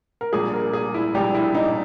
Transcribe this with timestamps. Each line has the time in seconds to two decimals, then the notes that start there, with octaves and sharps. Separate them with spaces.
0.21 A#4
0.33 A#1 A#2 G3 G#4
0.54 A#4
0.73 G#4
0.94 E4
1.14 A#1 A#2 G3 G4
1.34 E4
1.55 D#4